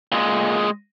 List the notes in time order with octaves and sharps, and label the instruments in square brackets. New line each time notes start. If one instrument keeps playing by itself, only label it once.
[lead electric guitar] A#2 G#3